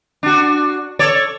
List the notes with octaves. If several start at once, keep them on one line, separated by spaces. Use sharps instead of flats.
D4 F#4
A4 C#5 D5